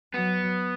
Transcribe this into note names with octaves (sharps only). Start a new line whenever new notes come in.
F#3 B3